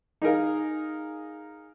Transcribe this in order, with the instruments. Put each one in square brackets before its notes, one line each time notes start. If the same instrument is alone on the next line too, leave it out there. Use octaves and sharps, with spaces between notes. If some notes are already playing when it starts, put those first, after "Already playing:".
[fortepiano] D#4 G#4 A#4 F5